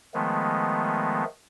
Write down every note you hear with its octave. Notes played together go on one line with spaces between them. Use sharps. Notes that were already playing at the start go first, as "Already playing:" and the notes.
D#3 F3 G#3 A3 B3